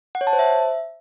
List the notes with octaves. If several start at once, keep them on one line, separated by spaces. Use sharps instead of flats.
F#5
C#5
A5
C5
E5